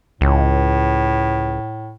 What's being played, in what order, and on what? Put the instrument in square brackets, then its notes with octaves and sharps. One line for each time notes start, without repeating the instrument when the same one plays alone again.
[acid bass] C#2 [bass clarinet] A2